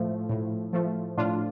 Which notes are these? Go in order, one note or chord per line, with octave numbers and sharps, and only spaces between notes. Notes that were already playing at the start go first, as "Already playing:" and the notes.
Already playing: A2 F3 A3
A2
F3 A3
A2 D4 F4